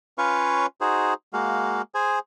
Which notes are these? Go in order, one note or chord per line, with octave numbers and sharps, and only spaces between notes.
C#4 F4 B4 C#5 F5 C#6
D#4 F#4 G#4 C5
G#3 A#3 F#4 F5
G#4 C5 G#5